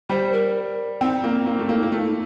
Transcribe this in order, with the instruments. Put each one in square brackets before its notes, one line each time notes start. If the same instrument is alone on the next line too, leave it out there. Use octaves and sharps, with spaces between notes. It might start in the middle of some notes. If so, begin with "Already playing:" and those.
[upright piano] G3 [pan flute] C5
[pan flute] A#4
[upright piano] C4 [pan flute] D#4
[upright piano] A#3
A#3
A3
A#3
A#3
A3